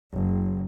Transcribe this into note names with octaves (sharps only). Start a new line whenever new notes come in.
F#1